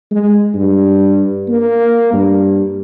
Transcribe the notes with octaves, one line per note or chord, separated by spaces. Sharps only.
G#3
G2
A#3
G2